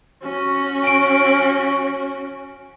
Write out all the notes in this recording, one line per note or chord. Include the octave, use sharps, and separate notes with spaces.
C#4 F#4
G#5 D7